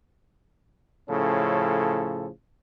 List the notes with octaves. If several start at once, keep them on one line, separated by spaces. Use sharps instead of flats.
A2 C#3 F3 C#4 A4